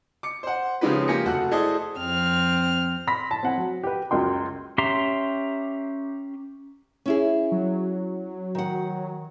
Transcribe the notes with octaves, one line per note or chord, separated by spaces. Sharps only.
D6 C#7
C5 F#5
C#3 F3 G#3 D#4 G4 B4
F3 A#3 G4 G#5 A#6 C#7
F1 F#4 A4 F#6
E4 G#4 A4 C5 D5 D#5
F2 C4 F6
B5 C6 A#6 B6
A5
C4 F#5 G#5
F#3
G4 B4
C#2 F#2 G5 C6
C#4 G4 E5 A#5 C6
C#4 E4 G#4
F#3
D#3 F#5